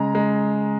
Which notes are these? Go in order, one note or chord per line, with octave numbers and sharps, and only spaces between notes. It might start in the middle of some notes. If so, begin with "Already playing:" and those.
Already playing: C#3 G#3 A#5
G#3